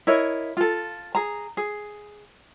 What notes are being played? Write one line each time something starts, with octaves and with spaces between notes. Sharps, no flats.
E4 A#4 C#5 D#5
F4 A4
G#4 A#5
G#4